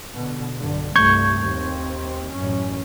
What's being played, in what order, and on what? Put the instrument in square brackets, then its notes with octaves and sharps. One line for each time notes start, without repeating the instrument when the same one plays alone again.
[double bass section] B2 D3
B1 G2 D3
[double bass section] C2 G2 A3 [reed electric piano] C#6 G6 G#6
[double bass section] D#2 C4
A1 F#2 C#4